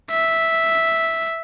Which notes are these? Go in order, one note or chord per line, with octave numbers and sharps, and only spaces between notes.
E5